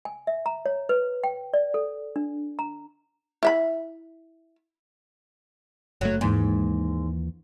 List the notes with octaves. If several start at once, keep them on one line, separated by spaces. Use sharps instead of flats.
G#5
E5
A#5
C#5
B4
G5
D5
A4
D4
A#5
E4 E5 B5
F#1 F#3 A3
D#2 G#2 E3 A#3